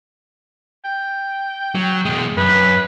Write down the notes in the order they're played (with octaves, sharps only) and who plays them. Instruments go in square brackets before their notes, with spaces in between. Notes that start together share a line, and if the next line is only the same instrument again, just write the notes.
[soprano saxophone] G5
[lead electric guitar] F#3
B2 G#3
[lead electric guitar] F#2 [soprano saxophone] B4